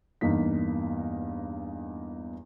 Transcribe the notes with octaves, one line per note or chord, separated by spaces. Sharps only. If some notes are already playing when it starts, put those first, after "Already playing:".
E2 G2 A#3 D#4 B6